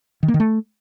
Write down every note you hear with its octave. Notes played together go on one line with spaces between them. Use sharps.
D#3
A#3
D#3
A3